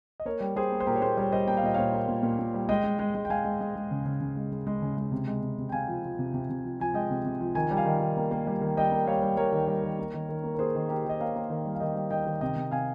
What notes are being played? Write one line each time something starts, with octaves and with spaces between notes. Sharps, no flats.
D#5
A#3 A#4 C#5
G3
G3 G#4 C5
A#3
C5
A#2 G4 A#4
C#5
A#3 G#4 C5
G3 A#4 C#5
G3 C5 D#5
A#3 G5
F5
A#2 D#5
A#2 C#5 F5
A#3
A#2
A#2
A#2
G3
G#3 D#5 G5
G#3
G#3
G#3
G5
G#3 F5 G#5
G#3
G#3
G#3
C#3
C#3
C#3
G#3
G#3
G#3
C#3
G#3
C3
G#3
C3
C3
G5
C3 F5 G#5
F3
F3
C3
C3
C3
F3
F3 G#5
G#3 D#5 G5
C3
C3
F3
D#3 G#5
G3
F5 G#5
D#3
D#3
A#3
A#3
G3
D#3
G3 D#5 G5
A#3
G3 C#5 F5
G3
G3 A#4 C#5
D#3
G3
D#3
A#3
D#3
D#3
A#3
A#4
A#3 G#4 C5
D#3
A#3 G4 A#4
D#3 D#5
A#3 C#5 F5
A#3
D#3
G3
F5
D#3 D#5 G5
G3
D#3 D#5 G5
D#3
C3 D#5 G5
C3
C3 F5 G#5